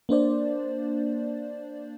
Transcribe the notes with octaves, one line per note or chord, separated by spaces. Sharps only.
A#3 D4 C5 D5